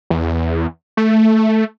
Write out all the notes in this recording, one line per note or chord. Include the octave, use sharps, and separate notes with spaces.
E2
A3